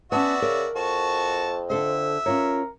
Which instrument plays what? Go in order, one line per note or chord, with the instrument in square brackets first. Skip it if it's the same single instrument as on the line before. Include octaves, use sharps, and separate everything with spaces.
[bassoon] B3 [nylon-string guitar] C#4 A5 [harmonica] F#4 D5 E5
[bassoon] C#3 [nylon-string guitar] A#4
[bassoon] F2 [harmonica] F#4 A5 C#6
[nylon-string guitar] D3 A4 C5 [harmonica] E5
[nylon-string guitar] C#4 F4 C#5 [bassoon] A#4